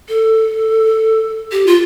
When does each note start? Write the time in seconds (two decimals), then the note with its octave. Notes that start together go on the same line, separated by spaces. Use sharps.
0.09 A4
1.52 G4
1.67 F4